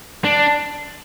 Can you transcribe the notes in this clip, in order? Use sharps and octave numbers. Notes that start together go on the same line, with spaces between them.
D4